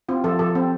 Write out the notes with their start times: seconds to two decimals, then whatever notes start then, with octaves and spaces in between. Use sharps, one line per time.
0.09 C4 F4
0.24 F3 A4
0.39 F3 A4
0.55 C4